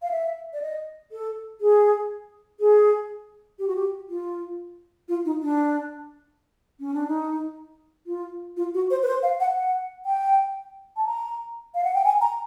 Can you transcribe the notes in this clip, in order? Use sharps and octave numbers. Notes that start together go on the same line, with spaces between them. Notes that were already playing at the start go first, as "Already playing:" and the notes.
F5
E5
D5
D#5
A4
G#4
G#4
G4
F#4
G4
F4
F4
D#4
D4
C#4
D4
D#4
F4
F4
F#4
C5
B4
C5
F5
F#5
F#5
G5
A5
A#5
F5
F#5
G5
G#5
A#5